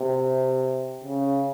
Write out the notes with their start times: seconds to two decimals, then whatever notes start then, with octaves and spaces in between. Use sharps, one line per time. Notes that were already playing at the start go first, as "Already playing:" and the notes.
Already playing: C3
1.04 C#3